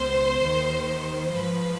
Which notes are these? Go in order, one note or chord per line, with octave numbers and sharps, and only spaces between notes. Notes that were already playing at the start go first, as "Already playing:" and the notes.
Already playing: C#2 B2 C5
D#2 D#3
G#2 F3 B4